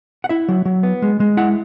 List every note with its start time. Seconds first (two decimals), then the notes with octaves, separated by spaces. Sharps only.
0.24 F#5
0.29 E4 E5
0.48 F#3
0.65 F#3
0.83 B3
1.02 G#3
1.20 G#3
1.37 E4 F#5